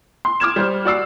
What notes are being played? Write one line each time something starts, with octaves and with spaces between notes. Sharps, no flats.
C6
D6 F6 G#6 E7
G3 C5 F6
F#4 D5 E6 C7